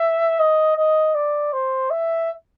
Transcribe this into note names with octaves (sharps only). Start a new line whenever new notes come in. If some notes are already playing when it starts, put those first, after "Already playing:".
Already playing: E5
D#5
D#5
D5
C5
E5